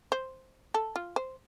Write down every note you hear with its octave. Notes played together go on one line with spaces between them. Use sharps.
C5
A4
F4
C5